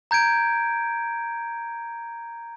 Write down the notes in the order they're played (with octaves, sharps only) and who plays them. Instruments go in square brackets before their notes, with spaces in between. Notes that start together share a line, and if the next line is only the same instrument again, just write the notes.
[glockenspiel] A#5 G6 G#6 D7